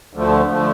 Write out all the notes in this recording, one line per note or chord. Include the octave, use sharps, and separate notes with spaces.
D2 D3 F3 A3
D3 F3 A3